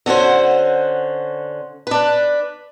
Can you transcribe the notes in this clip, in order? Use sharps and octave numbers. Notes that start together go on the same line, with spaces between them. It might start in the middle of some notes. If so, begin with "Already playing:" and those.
D3 C#4 F#4 C5
D4 B4